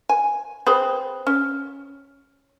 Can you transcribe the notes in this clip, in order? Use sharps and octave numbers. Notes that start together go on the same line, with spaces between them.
G#5
C4 G#4 B4
C#4